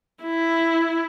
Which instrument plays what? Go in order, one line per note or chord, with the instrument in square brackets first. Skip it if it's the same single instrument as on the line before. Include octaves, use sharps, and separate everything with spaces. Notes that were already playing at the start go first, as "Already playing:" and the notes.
[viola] E4